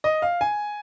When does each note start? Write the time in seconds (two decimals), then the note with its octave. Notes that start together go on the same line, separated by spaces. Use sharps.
0.04 D#5
0.22 F5
0.41 G#5